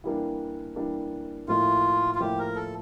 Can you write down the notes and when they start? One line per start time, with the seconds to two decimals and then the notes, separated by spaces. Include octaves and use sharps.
0.04 E3 G3 A#3 D4
0.76 E3 G3 A#3 D4
1.48 A2 F3 A#3 E4 F4
2.15 F4
2.20 A2 F3 A#3 E4 G4
2.39 A#4
2.56 A4